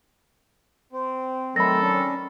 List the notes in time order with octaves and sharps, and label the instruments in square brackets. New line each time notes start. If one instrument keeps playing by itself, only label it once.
[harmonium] C4
[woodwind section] D#3 F#3 A4 [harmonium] A3 C4 [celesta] B5 A#6
[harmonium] C#4 D4